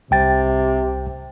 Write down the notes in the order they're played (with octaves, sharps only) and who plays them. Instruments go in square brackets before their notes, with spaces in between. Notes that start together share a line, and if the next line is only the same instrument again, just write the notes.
[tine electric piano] C2 G5 A6 [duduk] C3